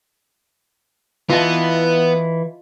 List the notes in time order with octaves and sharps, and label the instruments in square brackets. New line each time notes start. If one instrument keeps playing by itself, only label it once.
[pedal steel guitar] E3 E4 [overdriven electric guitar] B3 [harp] F4 D#5 A5